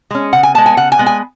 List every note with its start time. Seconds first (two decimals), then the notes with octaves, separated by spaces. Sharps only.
0.11 G#3 C#4
0.33 C#3 F#5
0.43 G#5
0.54 B3 A5
0.58 G#3
0.66 G#5
0.77 C#3 F#5
0.92 G#5
0.99 G#3 B3
1.06 G#5